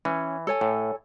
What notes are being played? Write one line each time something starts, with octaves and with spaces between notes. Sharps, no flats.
E3 C#4
A4 C#5 G#5
A2